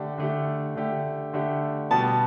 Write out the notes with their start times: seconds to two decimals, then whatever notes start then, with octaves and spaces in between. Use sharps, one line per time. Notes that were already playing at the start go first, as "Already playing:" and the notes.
Already playing: D3 A3 D4 G4
0.18 D3 A3 D4 G4
0.76 D3 A3 D4 G4
1.33 D3 A3 D4 G4
1.91 B2 G3 B3 A5